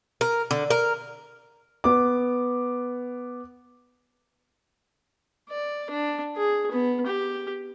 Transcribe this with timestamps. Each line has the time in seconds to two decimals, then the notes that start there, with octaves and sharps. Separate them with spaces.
0.21 A#4
0.51 D3
0.70 A#4
1.84 B3 D6
5.49 D5
5.90 D4
6.37 G#4
6.71 B3
7.07 G4